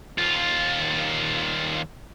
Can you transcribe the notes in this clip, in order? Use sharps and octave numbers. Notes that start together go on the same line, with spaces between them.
D#2 F4